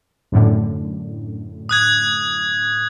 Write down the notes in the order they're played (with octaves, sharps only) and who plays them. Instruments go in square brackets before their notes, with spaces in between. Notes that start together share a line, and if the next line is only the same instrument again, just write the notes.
[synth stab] F#2 A2 D3
[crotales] D#6 F#6 G#6